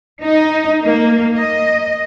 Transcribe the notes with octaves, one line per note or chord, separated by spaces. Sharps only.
D#4
A#3
D#5